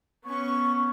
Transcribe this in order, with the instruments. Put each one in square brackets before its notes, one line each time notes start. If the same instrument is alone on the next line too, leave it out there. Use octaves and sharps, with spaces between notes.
[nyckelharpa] B3 C#4 [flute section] C#6